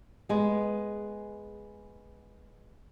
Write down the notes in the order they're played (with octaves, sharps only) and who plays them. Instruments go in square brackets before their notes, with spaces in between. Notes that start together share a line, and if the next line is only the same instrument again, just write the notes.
[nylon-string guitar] G#3 B3